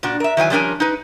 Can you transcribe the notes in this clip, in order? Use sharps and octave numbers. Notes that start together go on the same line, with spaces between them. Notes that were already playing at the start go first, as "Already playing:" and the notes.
A#2 D4 F#4
A#4 E5
D#3 E3 F#3 G#5
F3 G3 C#4 D4 A#4 G#5
D#4 B4